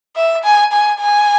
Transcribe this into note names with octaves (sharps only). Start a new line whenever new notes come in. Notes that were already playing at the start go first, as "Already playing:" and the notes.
E5
G#5
G#5
G#5